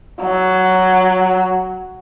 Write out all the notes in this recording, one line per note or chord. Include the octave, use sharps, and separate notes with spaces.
F#3